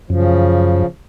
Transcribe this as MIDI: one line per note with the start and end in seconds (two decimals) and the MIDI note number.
0.10 0.83 42
0.10 0.86 49
0.10 0.86 53